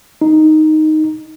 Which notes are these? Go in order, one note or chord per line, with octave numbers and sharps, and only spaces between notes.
D#4